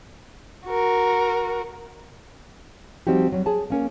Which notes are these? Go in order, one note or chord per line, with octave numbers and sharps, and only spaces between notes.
F#4 A#4
F3 G3 C4 D#4 F#4 G4
F#3 G3
G#4 A5
A#3 C#4 A#4